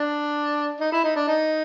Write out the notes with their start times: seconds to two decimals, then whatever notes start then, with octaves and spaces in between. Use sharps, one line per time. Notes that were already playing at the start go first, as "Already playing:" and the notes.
Already playing: D4
0.80 D#4
0.92 E4
1.04 D#4
1.16 D4
1.28 D#4